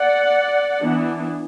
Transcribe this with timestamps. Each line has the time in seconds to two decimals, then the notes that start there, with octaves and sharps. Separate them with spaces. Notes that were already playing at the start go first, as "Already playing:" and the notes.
Already playing: D5 F#5
0.78 E3 B3 D4